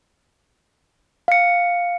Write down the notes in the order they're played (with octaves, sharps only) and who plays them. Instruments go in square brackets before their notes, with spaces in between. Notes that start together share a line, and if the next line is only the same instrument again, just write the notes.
[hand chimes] F5 C#7